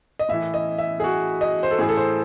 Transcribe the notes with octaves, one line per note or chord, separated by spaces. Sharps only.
D#5
A2 E3 E5
D#5
E5
G#4
F#4
D#5
C5
A4
A2 E3 G#4
A4
C5